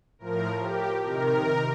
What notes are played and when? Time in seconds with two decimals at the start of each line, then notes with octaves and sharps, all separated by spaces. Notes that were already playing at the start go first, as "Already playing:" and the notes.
0.19 A2 F3 A#4
0.59 G4
1.01 C3 D#3 A#4